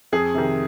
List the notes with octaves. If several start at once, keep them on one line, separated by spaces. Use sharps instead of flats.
F2 G#4
C3 D#3